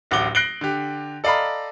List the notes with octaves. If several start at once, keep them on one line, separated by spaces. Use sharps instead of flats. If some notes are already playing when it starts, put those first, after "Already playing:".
D1 A1 F#5 D6 G7
F#6 A#6 C7 D7 F#7 G7
D3 G4
A4 D5 D#5 F5 A#5 B5